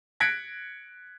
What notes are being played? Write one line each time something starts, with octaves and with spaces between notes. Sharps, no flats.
F#6 G#6 A#6 B6 C#7 D7